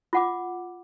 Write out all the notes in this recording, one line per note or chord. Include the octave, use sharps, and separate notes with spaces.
F4 F#5 D6